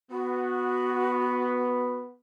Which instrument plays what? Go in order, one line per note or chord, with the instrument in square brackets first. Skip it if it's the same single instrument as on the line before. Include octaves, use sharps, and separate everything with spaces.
[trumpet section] B3 [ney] F#4